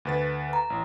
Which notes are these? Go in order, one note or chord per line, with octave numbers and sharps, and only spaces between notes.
D2 B4 A6
A#5
A1